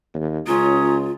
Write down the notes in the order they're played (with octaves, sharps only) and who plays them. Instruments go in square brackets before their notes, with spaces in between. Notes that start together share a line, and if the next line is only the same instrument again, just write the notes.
[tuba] D#2
[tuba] C#2 [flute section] C#4 A#5 D#6 [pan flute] F4